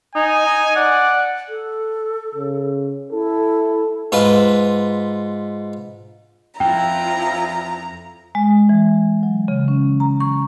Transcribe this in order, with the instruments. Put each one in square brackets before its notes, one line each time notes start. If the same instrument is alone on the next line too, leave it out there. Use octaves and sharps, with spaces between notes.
[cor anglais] D#4 [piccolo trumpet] G#5
[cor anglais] D#4
[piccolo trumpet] D5 [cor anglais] F#5
[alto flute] A4
[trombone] C#3
[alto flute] E4 [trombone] A4
[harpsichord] G#2 F4 B4
[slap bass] F2 [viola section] F3 E4 F4 [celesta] G5 [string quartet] A#5
[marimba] G#3
E3
F#3
C#3
C#4
A#5
C#6